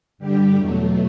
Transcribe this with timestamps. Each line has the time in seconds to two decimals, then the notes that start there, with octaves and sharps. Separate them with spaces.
0.18 G2 D3 G3 G4
0.56 E2 B2 F#3 A3